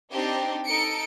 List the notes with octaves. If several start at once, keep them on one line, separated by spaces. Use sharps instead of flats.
C4 D4 D#4 G4
D#4 A4 C#7 D7